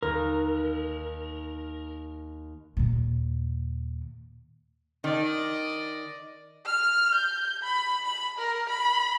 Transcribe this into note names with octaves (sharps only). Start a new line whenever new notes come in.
D#2 A#4
D#2 A#2
D#3 D5 D#5
F6
G6
B5
B5
A#4
B5